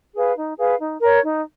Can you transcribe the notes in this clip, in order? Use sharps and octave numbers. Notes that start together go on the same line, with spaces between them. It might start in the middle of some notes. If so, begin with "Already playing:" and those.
G#4 B4 F5
D#4
G#4 B4 F5
D#4
A#4 C#5
D#4